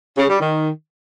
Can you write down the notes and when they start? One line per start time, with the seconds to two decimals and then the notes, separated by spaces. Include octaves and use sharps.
0.18 C#3
0.29 G3
0.40 D#3